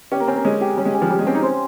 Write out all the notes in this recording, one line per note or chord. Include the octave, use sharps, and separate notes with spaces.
C#4 G4
A#3
C4 C#4
A#3
G#3 C#4
G4
G3 C#4
G#3
C#4
F3
G3 C#4
G#3
C4 C#4
D#4
C5